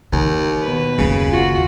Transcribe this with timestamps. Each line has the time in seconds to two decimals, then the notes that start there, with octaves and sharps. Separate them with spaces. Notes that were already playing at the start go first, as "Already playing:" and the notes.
0.12 D#2 D#3
0.62 B2 B4
0.98 F#1 D#2 C#3
1.30 F4 F#4